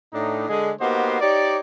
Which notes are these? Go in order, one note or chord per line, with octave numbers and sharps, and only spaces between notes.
A2 D4 D#4
D3 G#3 G#4
A#3 B3 D#4 F#4 G4 C5
D#4 G4 C#5 D5